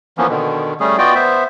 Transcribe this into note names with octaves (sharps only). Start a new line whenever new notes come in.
E3 F3 A#3 B3 C#4
B2 D3 D#3
G3 A3 C#4 G#4
B3 F4 F#4 D5 D#5 G5
B3 C5 E5